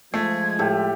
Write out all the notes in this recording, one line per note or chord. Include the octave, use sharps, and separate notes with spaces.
F3 G#3 A3 G#6
A2 G4 A4